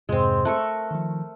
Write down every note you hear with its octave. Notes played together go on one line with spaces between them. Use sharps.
F2 G#2 C3 G#3 C4
A3 A#4 C#6 F#6
D#3 F3